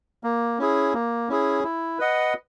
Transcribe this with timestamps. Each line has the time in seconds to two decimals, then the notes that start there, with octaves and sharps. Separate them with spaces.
0.24 A#3
0.59 C#4 E4 G#4
0.94 A#3
1.29 C#4 E4 G#4
1.64 E4
1.99 B4 D#5 F#5